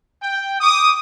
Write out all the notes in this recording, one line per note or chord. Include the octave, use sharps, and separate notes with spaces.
G5
D6 D#6